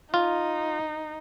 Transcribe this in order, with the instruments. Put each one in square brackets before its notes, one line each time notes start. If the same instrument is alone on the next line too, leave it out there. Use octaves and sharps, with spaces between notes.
[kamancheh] D#4 [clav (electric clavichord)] F4